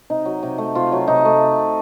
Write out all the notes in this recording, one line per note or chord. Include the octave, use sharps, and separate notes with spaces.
C3 D#4
F#3
C3
A3
C3 F4
F#3
C3 D#4
A3